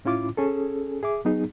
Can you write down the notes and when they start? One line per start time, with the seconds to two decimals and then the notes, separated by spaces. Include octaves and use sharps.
0.05 A2 C#4 E4 F4 D6
0.37 C#4 G#4 A4
1.03 G#4 E5 D6
1.25 F#3 B3 D#4 G#4